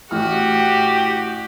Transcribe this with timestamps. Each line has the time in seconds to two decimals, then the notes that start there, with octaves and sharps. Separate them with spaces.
0.11 A1 F#4 G4 F6